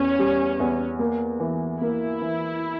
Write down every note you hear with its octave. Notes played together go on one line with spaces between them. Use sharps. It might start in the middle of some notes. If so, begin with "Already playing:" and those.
Already playing: E2 C#4
G3
E2
A#3
E3
A#3 E4
E3